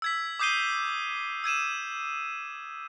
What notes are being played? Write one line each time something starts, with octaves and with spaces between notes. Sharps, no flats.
E6 G#6 B6
D6 D#6 G6 C7 D#7 G7
E6 G#6 D#7 E7